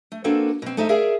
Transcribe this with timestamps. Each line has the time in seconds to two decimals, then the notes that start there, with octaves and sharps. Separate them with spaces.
0.12 A3
0.24 A#3 C4 D4 F#4 A4 B4
0.62 B2 C4
0.77 A3 D#4 C5 E5
0.89 G#4 A#4 D5 E5 F5